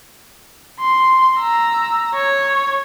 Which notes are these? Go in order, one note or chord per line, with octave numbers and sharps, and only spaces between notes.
C6
A#5 E6
C#5